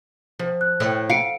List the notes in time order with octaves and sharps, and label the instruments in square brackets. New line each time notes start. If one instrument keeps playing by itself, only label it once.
[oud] F3
[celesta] F#6
[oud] A2
[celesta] F4 C#7 D7 [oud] F5